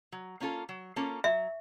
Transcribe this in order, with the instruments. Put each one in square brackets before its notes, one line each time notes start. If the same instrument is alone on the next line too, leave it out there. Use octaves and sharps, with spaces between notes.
[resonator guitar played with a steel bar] F#3
A#3 C#4 F4 A4
F#3
A#3 C#4 F4 A4
[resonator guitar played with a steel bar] F#3 [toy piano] E5